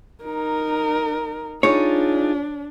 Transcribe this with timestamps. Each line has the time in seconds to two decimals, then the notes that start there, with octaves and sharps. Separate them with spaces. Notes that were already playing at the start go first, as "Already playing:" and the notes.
0.24 D#4 A#4
1.63 D4 D#4 F4 G#4 C#5